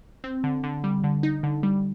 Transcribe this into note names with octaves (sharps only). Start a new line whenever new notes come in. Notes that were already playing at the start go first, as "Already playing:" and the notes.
C4
D3
D3
G3
D3
D#4
D3
G3